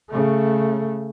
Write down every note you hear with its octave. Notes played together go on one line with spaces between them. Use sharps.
C#3 A3